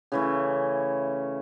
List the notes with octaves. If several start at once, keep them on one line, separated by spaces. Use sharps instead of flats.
C#3 E3 A3